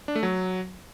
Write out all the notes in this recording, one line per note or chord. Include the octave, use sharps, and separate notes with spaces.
D4
A3
F#3